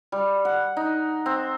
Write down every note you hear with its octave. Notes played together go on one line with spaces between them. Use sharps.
G3
F#5
D#4
C4